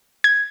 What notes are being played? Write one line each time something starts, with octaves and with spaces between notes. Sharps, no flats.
G#6